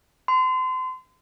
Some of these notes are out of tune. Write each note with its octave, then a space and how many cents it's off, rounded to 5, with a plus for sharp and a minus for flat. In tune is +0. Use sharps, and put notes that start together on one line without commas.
C6 -35